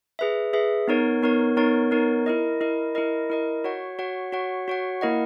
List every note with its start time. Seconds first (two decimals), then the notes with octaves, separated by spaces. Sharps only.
0.19 G#4 B4 E5
0.53 G#4 B4 E5
0.88 B3 D#4 A#4 C#5
1.23 B3 D#4 A#4 C#5
1.57 B3 D#4 A#4 C#5
1.91 B3 D#4 A#4 C#5
2.26 E4 A#4 D#5
2.61 E4 A#4 D#5
2.95 E4 A#4 D#5
3.30 E4 A#4 D#5
3.64 F#4 C#5 F#5
3.99 F#4 C#5 F#5
4.32 F#4 C#5 F#5
4.68 F#4 C#5 F#5
5.01 A#3 E4 A#4 D#5 F#5